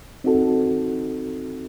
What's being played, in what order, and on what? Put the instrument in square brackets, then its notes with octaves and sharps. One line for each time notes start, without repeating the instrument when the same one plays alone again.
[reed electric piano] C4 D#4 F#4 A4